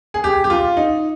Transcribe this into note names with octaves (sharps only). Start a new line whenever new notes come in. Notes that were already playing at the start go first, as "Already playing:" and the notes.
G#4
G4
G4
F4
D#4